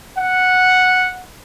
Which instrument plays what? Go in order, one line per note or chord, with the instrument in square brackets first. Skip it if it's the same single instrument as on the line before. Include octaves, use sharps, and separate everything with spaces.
[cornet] F#5